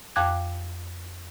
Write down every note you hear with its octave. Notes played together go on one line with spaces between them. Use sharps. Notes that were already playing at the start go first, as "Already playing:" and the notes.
F2 F5 G5 D6 F#6 G#6